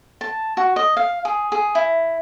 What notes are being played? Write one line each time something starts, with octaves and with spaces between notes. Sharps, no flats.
A5
F#4
D#5
F5
G#4
G#4
E4